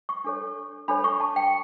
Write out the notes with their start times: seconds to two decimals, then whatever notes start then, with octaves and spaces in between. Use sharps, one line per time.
0.09 C#6
0.24 D4 A4 C#5
0.88 D4 A4 C#5 B5
1.04 C#6
1.20 A5
1.36 G5